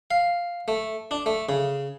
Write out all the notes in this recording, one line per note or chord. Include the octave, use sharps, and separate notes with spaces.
F5
A3
D4
A3
C#3